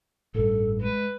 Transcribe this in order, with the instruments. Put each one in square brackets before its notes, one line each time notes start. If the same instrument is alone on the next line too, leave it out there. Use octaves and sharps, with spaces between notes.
[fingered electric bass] A1 G2 [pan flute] A4
[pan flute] G#3 [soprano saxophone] B4